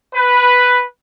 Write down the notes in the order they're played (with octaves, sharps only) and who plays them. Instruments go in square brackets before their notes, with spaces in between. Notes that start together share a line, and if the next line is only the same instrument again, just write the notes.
[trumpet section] B4